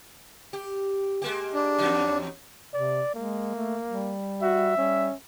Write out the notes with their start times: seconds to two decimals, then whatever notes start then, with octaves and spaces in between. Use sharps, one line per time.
0.53 G4
1.22 G#3 A#3 G4
1.54 D4
1.78 E2 F#3 D#4
2.74 C3 D5
3.15 G#3 A#3
3.55 A3
3.89 G3
4.42 F#4 E5
4.77 G3 C#4